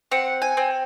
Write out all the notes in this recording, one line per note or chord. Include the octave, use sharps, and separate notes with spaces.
C4 F#5
G#5
C4